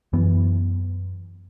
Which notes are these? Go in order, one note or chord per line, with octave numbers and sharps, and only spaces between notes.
F#2 E3 B3